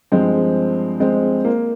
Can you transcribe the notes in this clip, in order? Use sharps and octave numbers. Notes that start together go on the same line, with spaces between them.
G2 F3 G#3 C4
G#3 C4
A#3